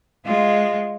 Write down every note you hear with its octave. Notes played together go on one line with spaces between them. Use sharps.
G#3 F4